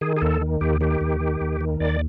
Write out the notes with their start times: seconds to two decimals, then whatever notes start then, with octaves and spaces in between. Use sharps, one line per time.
0.01 D#3 G#4
0.16 G#4
0.22 D#2 A4
0.41 D#3
0.61 D#2 G4
0.81 D#3 G4
1.01 D#2
1.20 D#3
1.41 D#2
1.61 D#3
1.80 D#2 D5